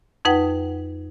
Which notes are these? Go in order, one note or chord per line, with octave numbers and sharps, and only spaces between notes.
F2 D#4 B4 F#5 G5